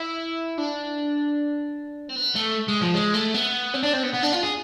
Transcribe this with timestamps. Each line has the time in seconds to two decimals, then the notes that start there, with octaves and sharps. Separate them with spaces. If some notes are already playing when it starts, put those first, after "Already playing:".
Already playing: E4
0.58 D4
2.09 C4
2.15 B3
2.35 A3
2.68 G#3
2.81 F3
2.94 G#3
3.14 A3
3.34 B3
3.74 C4
3.83 D4
3.93 C4
4.03 B3
4.13 B3
4.23 D4
4.32 F4
4.43 G#4